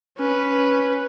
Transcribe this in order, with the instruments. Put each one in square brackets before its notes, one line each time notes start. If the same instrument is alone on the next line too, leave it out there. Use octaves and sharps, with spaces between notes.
[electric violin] C#4 B4